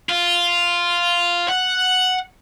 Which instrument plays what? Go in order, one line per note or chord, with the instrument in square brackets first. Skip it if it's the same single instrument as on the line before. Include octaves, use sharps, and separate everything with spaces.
[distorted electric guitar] F4
F#5